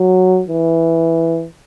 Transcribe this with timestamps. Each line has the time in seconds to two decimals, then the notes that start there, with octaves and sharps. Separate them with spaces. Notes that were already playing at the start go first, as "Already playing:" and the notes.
Already playing: F#3
0.48 E3